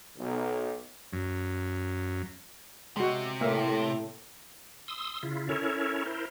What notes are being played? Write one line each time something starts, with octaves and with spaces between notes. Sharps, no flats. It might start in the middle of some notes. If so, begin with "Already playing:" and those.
B1
F#2
C3 G#3 F#4
A2 A#3 E5 F5
C6 D#6 E6
C#3 E4 F4
C#4 E4 A4 A#4 C#5
E4 A#4 C5